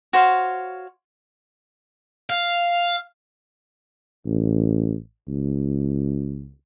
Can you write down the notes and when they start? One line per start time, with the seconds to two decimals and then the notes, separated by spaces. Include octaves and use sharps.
0.13 F#4 C5 C#5 F5
2.30 F5
4.26 A1
5.28 C#2